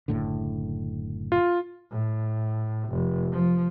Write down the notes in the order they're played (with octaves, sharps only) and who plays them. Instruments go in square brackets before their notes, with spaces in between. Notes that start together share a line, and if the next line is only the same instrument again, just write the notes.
[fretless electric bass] F#1 A2 D3
[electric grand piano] F4
[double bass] A2
F1
F3